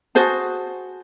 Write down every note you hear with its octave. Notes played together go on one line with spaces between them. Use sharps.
F#4 G#4 C5 A5